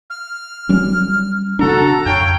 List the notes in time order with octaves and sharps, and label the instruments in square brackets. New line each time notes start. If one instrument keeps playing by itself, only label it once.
[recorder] F6
[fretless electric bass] F#3 G3 C#4
[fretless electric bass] C#3 D4 [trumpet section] F#4 A4 [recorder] A#5
[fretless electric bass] F2 [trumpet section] C#5 F5 G5